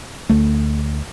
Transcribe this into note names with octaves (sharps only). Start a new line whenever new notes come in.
D2 A3